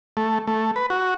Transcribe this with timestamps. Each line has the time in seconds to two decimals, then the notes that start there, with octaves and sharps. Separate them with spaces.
0.17 A3
0.47 A3
0.76 B4
0.90 F#4